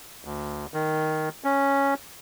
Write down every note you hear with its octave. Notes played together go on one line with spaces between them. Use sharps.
D2
D#3
C#4